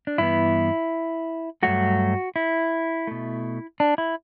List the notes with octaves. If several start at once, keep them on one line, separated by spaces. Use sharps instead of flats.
D4
G2 E3 B3 E4
G2 F#3 A3 F#4
E4
B2 A3
D4
E4